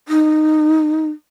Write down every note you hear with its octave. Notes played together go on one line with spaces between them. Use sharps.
D#4